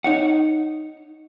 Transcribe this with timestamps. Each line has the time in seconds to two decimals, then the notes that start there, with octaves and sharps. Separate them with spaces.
0.04 D#4 C#5 F#5